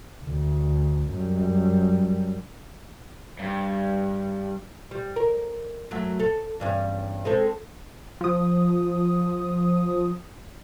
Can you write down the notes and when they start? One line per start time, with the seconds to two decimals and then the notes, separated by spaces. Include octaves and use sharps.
0.24 D2
1.11 F#2 G3
3.39 G2
4.91 G3
5.16 A#4
5.91 F#2 F#3 A3
6.19 A4
6.60 E2 G2 C#4
7.25 G#3 C4 A4
8.21 F3 D#6